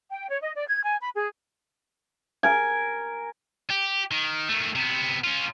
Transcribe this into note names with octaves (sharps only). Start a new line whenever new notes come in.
G5
C#5
D#5
D5
G#6
G#5
B5
G#4
A#4 G#5
G4
D#3
D#3 A3
C3 B3
C#4 F4